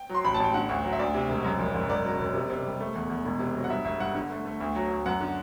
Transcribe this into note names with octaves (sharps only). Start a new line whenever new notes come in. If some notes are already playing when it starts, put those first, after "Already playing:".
Already playing: G5
F#3
C6
A1 B5
A5
A1 G5
D3 F#5
D2
F#3
E5
D2 D5
C3
E1
F#2
F#1
F#1
E1 D5
F#3
E1
C3
C3
G3
A3
E2
E2
E1
C3
F#3
F#5
G2 E5
G1 E5
G2 F#5
D3
A3
A3
D2
F#3
D2
F#2 F#5
D3